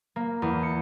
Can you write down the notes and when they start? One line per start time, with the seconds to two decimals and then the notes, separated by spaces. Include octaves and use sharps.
0.16 A#3
0.42 E2
0.63 C#7